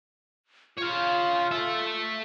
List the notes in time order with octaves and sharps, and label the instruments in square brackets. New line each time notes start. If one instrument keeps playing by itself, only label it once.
[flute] F4 [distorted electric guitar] C#5 F5
[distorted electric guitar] A4 E5